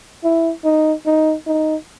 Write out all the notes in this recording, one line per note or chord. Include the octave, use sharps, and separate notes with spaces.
E4
D#4
D#4
D#4